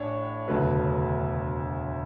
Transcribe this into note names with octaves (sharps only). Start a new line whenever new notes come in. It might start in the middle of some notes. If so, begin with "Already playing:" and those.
Already playing: A1 A2 D4 C#5
E1 D2 C#3 F#3 A3 B4